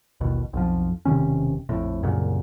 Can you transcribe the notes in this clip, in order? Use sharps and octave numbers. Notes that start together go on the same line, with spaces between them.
A1 D#2 B2
B1 F2 F3
E1 C3 D#3 C#4
A#1 F2 A2
C2 F#2 A#2 C#3